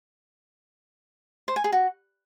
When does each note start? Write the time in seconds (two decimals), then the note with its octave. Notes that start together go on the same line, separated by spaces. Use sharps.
1.48 C5
1.56 G#5
1.64 G#4
1.72 F#4